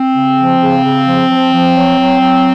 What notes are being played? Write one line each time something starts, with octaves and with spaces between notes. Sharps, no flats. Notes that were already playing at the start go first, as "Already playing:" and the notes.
Already playing: C4
C#3
F3
C#3
C#3
F3
F3
F3
F#3
F#3
F#3